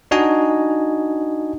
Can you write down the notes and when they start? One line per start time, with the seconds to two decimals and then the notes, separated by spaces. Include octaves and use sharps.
0.11 D4 D#4 F#4 D#5 G#5